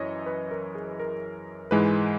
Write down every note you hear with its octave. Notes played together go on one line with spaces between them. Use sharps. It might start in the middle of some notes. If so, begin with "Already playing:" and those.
Already playing: F#2 E3 C#5 D#5
B4
A#4
G#4
B4
A#4
G#2 E3 G#3 B4